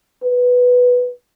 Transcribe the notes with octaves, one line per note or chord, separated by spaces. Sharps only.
B4